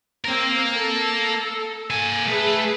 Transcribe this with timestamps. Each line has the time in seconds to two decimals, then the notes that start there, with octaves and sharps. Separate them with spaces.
0.25 A#3 C4 A#4
0.74 A4
1.90 A#3 G#5
2.28 A3 G#4 B4